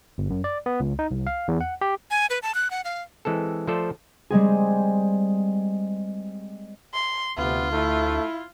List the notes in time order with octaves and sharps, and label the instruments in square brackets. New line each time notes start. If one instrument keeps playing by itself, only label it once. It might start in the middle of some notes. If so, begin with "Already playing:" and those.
[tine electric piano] G1
F#2
D5
B3
C#2
D#4
C2
F5
E2
F#5
G4
[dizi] G#5
B4
A5
F#6
F#5
F5
[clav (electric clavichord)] E3 G#3 C4 A4
F3 A3 F4 A4 C5 D5
[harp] G3 G#3 C4 G#4
[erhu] C6
[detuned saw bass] D2 [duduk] C3 [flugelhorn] B3 [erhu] F4
[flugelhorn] A3 [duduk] E4